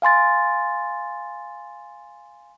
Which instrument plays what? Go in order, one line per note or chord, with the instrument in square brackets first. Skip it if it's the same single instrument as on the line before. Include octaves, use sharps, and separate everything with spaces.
[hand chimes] F5 G#5 C6 A6